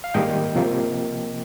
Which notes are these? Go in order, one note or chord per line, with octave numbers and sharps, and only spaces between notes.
F5
G#2 D#3 G3 A#3 D#5 G5
C3 F3 A#3